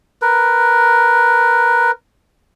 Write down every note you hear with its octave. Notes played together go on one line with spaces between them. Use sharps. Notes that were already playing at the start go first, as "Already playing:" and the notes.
A#4 B4